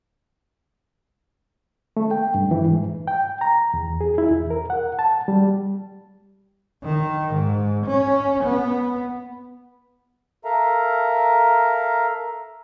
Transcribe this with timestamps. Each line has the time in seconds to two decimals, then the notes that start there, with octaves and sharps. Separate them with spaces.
1.97 A3
2.11 G5
2.34 G2
2.51 E3
2.67 G#2
3.07 G5
3.41 A#5
3.74 E2
4.01 G#4
4.18 E4
4.31 E2
4.50 A#4
4.70 F#5
4.99 A5
5.28 G3
6.83 D#3
7.34 G#2
7.86 C#4
8.44 B3
10.45 A4 A#4 E5 F5 A#5